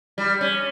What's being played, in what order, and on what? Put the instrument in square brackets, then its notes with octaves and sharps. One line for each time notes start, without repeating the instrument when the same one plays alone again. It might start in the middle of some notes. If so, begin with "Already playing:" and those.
[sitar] G3
C#4